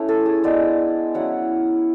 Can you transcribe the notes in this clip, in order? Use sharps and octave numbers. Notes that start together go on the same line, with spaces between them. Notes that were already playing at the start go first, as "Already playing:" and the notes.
Already playing: A3 C#4 E4
A4
G#4
G#3 B3 D4 D5
F#3 C#4 E4 F#5